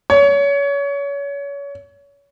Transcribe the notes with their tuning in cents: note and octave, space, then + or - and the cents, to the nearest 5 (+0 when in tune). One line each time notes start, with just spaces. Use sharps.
C#5 +30